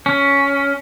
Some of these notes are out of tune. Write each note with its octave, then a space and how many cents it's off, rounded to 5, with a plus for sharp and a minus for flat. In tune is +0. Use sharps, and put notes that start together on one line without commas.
C#4 +10